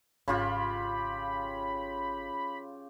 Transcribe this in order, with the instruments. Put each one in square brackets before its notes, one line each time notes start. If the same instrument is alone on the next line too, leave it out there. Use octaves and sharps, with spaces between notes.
[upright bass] G#1 [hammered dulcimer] C#3 F4 G4 [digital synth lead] B5